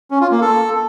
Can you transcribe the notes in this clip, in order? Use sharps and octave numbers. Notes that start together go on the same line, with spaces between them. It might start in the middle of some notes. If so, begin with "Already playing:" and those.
C#4
F4
A#3
A4